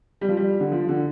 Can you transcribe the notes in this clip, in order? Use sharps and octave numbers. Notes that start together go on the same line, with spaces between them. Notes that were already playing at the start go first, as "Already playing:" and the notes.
G3
F3
G3
D3
F3
D3